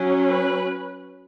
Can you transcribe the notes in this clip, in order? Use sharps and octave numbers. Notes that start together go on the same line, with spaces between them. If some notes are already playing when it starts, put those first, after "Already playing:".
Already playing: F#3 C#4
B4